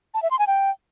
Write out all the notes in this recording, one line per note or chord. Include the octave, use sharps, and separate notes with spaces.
A5
E5
C6
G#5
G5